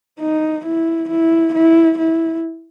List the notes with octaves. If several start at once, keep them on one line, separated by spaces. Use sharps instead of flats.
D#4
E4
E4
E4
E4